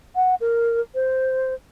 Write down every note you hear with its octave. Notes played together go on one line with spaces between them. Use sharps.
F#5
A#4
C5